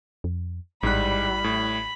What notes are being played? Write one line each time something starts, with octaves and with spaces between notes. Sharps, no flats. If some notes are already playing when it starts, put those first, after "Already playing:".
F2
A1 G#2 G3 E4 B5 F#6
A2